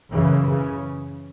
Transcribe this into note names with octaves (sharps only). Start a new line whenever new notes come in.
F#2 C#3 E3
C#3